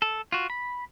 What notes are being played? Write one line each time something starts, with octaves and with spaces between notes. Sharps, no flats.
A4
F4 F#4
B5